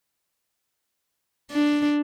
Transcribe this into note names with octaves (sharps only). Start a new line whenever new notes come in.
D4